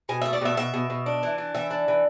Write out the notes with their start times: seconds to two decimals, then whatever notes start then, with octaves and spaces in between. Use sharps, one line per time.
0.09 B2 G#5
0.21 E5
0.26 A3
0.33 D5
0.41 B2 E5
0.57 B2 E5
0.74 B2
0.90 B2
1.06 D4
1.23 E3
1.38 D4
1.55 E3 E5
1.71 D4
1.88 E3